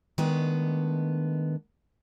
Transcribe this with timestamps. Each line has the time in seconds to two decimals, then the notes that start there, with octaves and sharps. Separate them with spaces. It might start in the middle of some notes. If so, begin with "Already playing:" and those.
0.18 D#3 G#3 A3 B3 D4